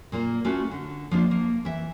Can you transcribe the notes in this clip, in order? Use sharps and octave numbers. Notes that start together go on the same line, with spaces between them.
A#2 A#3 F4
A3 C#4 F4 F#4
D3
F3 A#3 D4 F4
A#3
E3 E5